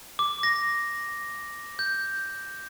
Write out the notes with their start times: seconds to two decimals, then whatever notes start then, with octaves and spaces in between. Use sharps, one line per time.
0.19 D6
0.43 A#6
1.79 G6